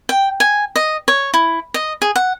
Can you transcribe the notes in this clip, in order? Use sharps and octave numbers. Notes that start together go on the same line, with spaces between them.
G5
G#5
D#5
C#5
E4
D#5
G#4
F#5